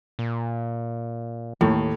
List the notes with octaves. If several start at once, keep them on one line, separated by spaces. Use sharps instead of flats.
A#2
D#2 A2